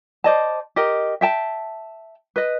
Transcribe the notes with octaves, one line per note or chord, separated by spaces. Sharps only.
C5 D5 D#5 A5
G4 A#4 D#5
E5 G5 A5
B4 D#5